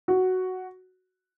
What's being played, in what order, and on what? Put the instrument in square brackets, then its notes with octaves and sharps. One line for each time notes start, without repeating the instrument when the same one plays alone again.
[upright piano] F#4